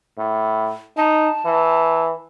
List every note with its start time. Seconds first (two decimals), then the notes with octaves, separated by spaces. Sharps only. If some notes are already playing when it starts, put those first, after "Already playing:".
0.18 A2
0.97 D#4 A5
1.45 E3